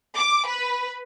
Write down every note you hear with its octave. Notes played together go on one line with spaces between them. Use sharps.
D6
B4